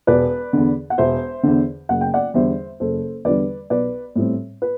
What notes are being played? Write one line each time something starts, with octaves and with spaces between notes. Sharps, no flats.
E1 B4 D5
E2 D3
F#5
E1 C5 E5
E2 D3
F#1 F#5
G5
D5 F#5
E2 D3 G3 C5 E5
F#1 A4 C5
E2 D3 G3 B4 D5
B1 B4 D5
A2 G3 C4
B4